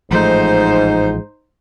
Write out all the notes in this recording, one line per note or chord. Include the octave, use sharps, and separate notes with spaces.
A1 G#2 F3 A3 D#4 C5